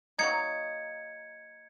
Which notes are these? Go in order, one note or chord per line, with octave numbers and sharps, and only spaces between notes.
F#3 A#3 D#4 G#6 C#7